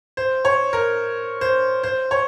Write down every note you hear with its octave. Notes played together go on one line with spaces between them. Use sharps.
C5
C#5
A#4
C5
C5
C#5